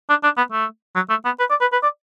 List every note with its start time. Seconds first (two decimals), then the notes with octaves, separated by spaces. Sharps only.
0.09 D4
0.24 D4
0.37 B3
0.52 A3
0.95 F#3
1.10 A3
1.25 B3
1.39 B4
1.50 D5
1.61 B4
1.72 B4
1.83 D5